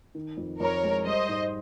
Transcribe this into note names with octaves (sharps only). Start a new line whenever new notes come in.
D#3
F2
F2 A#4 C#5
G#3
G3 C5 D#5
G#2